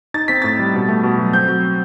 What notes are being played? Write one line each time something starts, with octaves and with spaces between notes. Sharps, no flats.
D#4 A6
C4 B6
A2 A6
G3
B2
A3
B2
F#3
C4 G6
F#3